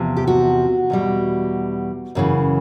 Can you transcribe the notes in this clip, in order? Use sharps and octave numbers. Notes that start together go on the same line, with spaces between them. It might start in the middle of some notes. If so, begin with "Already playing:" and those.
Already playing: E2 C3 F3
G4
F#4
E2 B2 G3
F#2 C#3 E3